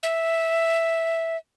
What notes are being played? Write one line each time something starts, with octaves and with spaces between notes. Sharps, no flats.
E5